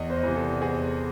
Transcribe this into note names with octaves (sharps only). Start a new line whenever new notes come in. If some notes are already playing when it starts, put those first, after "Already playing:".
Already playing: E2 D#5
C5
C3 E3
A4
E2 G#4